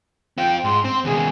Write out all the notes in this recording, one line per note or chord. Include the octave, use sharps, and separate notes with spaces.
C4 F4 G5
G#2 C6
C4
D#2 B2 G#4